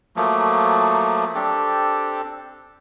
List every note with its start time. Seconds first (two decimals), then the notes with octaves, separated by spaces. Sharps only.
0.16 F3 F#3 A3 A#3
1.35 C4 D4 G4 A4